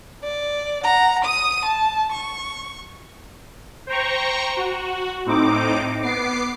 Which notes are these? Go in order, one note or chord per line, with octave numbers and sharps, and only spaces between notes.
D5
F#5 A#5
D#6 D#7
A5
C#6
C5 G5 A#5 C#6
F#4
A2 C4 D#4 D6
B3 D6 C7